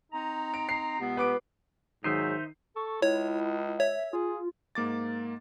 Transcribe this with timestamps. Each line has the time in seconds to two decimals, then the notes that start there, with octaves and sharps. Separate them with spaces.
0.12 C4 D#4 A#5
0.54 D7
0.69 C7
1.00 C#2 C3 B3
1.17 B4 D6 D7
2.04 G#2 D#3 F#3 D#4 G#4 C5 E5 C7
2.76 A4 C#6
3.02 C#2 E4 C#5
3.79 C#5 E5
4.13 F4 G#4
4.75 G#2 A#3 D6 A6